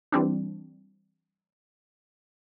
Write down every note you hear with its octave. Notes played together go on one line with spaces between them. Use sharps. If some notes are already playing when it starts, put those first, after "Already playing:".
E3 G3 C4 D4